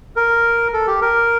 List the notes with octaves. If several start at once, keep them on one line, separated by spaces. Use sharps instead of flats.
A#4
A4
G4
A#4